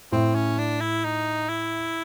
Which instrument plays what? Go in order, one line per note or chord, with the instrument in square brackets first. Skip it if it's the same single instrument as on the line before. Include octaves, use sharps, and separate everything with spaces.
[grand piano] A2 [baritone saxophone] C4
[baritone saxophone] C#4
D4
E4
D#4
E4